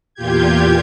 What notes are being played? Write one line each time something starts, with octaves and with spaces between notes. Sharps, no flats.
E2 A#2 F4 G4 G6 G#6